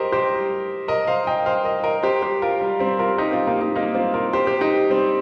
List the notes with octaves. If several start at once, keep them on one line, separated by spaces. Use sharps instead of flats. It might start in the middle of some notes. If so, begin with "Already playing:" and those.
Already playing: G4 A#4 C5 D#5
G4 C5
A#4 D#5
C5 F5
D#5 G5
C5 F5
A#4 D#5
A#4 D#5
G4 C5
G4 C5
F4 A#4
G3
G3 C4
F4 A#4
D#4 G4
C4 F4
A#3 D#4
A#3 D#4
A#3 D#4
C4 F4
F4 A#4
G4 C5
G4 C5
D#4 G4
G3 C4